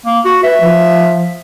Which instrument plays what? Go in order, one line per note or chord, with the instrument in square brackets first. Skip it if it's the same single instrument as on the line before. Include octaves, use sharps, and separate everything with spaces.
[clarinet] A#3
F#4
[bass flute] B4 [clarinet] E5
[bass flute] F3